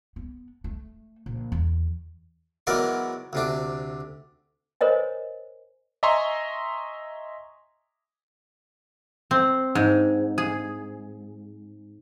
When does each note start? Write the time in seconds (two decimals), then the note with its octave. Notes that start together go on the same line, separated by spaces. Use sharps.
0.16 B3
0.64 A3
1.26 A#1
1.52 E2
2.67 E3 F#3 G#3 B3 A#4 D5
3.33 D2 C3 D4
4.81 A#4 C5 C#5 D#5 G#5
6.03 D#5 E5 G#5 A#5 C6 C#6
9.31 C4
9.75 G#2
10.38 G#4